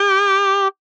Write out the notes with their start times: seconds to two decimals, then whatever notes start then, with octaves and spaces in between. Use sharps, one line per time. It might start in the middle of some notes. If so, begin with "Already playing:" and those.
Already playing: G4